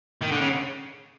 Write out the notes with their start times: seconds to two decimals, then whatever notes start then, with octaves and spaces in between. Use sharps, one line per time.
0.21 D#3
0.31 D3
0.40 C#3